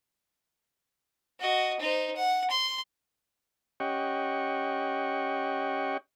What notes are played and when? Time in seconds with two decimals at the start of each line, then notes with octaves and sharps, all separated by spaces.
1.40 F#4 D#5
1.79 D#4 C5
2.16 F#5
2.50 C6
3.80 C#4 G4 D#5 F#5 G5 C#6